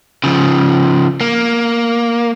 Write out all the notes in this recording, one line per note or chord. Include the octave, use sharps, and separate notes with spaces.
C#3 F3
A#3